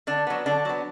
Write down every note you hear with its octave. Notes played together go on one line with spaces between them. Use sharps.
D3 D4
F#3 B3
D3 D4
F#3 B3